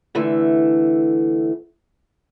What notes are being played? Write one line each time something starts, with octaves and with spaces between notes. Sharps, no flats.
D3 E3 A3